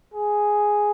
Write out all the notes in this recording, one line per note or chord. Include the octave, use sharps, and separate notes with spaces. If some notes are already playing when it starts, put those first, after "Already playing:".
G#4